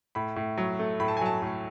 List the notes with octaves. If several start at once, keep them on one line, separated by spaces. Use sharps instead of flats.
A2 B5
A2
F#3
A3
A2 B5
A5
G#5
F#3 A5
A2